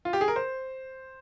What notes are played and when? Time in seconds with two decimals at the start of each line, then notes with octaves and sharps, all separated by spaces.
0.05 F4
0.13 G4
0.21 G#4
0.28 A#4
0.36 C5